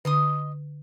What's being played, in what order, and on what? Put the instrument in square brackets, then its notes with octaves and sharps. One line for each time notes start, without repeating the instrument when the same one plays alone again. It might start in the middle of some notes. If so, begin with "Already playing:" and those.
[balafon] D3 [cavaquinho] D#5 C6 D#6